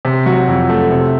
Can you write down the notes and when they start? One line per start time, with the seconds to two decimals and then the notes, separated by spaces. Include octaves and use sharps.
0.05 C3
0.26 F#3 F#4
0.48 F2
0.69 A3
0.91 C3